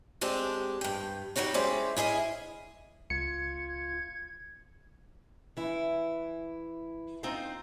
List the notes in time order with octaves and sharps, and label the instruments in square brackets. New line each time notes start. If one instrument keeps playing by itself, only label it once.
[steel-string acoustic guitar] G#3 C4 D4 G4
G2 G5
F#3 G3 D#4 F#4 C#5
G#3 C#4 E4 C5 D5 G5
E4 G#4 D#5 F5
[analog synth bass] C#2 [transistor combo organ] F4 [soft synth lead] G#6 [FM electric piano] C#7
[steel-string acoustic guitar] E3 E4
C4 D#4 F4 C5 F5